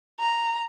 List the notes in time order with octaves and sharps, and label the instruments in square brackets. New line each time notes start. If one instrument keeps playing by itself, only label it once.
[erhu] A#5